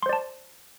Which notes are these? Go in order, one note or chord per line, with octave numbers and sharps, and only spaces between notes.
C5 D5 A5 C6